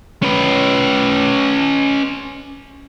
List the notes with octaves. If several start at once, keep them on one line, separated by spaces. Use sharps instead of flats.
C#4 B4